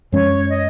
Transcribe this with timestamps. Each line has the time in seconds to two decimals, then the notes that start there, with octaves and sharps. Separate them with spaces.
0.12 F#2 F3 G#3 C#4 C#5
0.50 D#5